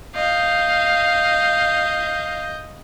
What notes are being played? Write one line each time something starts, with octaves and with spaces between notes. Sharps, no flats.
D#5 F5 G6